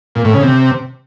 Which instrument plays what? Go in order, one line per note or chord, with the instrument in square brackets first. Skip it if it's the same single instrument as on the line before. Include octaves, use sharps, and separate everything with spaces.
[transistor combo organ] A#2
A2
C#3
C3